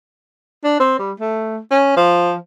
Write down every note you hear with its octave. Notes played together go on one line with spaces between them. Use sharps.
D4
C4
G3
A3
C#4
F3